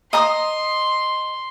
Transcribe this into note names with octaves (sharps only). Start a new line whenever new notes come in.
D#5 A#5 C6 D#6